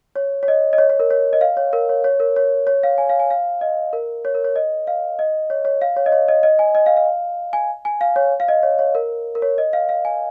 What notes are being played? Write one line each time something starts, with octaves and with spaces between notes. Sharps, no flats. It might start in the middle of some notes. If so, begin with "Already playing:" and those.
C#5
C#5
D#5
D#5
C#5
C#5
A#4
C#5
D#5
F5
C#5
A#4
C#5
C#5
A#4
C#5
C#5
F5
G#5
F5
G#5
F5
D#5
A#4
C#5
A#4
C#5
D#5
F5
D#5
C#5
C#5
F5
C#5
D#5
C#5
D#5
D#5
G#5
D#5
F5
F5
G#5
G#5
F5
C#5
F5
D#5
C#5
C#5
A#4
A#4
C#5
D#5
F5
F5
G#5